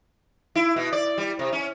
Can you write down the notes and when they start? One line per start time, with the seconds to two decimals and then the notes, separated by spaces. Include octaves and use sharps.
0.55 E4
0.76 B2
0.93 D5
1.18 G3
1.39 C3
1.53 C#4